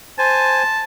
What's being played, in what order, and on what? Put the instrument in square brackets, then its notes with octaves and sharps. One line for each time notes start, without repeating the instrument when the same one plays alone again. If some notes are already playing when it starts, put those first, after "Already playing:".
[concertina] C5 G#5 [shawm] A5